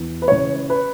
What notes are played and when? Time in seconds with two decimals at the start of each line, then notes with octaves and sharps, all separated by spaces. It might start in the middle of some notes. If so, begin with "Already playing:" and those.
Already playing: E2
0.22 B4
0.28 C#3 E3 C#5
0.70 B4